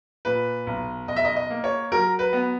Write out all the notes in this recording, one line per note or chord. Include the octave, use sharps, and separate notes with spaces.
A#2 B4
B1
B1 D#5
E5
D#5
D#5
A#3
C#5
F#3 A#4
B4
B3